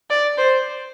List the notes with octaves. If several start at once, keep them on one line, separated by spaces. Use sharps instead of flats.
D5
C5